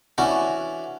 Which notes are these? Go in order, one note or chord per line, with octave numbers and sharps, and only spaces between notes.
E3 C#4 D4 F#4